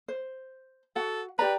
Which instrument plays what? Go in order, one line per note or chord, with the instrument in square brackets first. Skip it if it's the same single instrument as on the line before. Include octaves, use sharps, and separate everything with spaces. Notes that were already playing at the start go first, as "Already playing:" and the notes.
[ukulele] C5
[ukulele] F#4 F#5 [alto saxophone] A4
[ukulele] G4 D5 A#5 [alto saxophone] B4